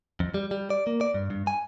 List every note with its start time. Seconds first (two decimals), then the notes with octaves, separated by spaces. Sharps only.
0.20 F2
0.34 G3
0.51 G3
0.70 D5
0.87 A#3
1.01 D5
1.14 G2
1.30 G2
1.47 G#5